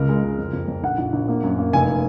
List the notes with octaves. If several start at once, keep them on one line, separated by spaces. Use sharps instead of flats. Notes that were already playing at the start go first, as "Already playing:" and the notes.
Already playing: C#2 C#3 A#4
G#3
C#2
F2
F2
F2
A#1 F#5
A#1
A#1
A#3
F#2
A#3
F1 G#5